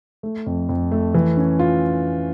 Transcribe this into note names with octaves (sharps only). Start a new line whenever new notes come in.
A3
F2
F2
A3
E3
C#4
F4